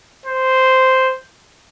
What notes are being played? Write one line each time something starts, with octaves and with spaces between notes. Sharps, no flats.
C5